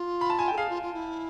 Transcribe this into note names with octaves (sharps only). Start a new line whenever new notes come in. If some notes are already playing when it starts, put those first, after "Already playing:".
Already playing: F4
B5
A5
G#5
G5
A4
G#4 F5
F4
F4
E4